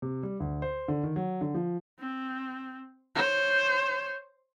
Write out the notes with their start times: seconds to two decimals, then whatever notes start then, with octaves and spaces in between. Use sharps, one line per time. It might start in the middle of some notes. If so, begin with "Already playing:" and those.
0.02 C3
0.23 G3
0.40 D2
0.62 C5
0.88 D3
1.03 D#3
1.16 F#3
1.41 D3
1.55 F3
2.00 C4
3.15 C5 C#5